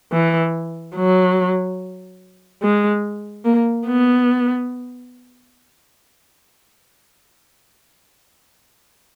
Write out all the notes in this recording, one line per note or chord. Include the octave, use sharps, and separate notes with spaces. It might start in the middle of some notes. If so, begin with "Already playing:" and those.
E3
F#3
G#3
A#3
B3